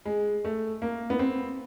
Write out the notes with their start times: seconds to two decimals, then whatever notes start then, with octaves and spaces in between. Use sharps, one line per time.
0.06 G#3
0.45 A3
0.82 A#3
1.10 B3
1.19 C4